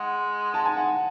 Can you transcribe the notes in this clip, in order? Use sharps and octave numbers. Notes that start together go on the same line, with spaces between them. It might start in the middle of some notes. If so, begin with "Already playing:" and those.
Already playing: G#3 F#5
A5
G#5
F#5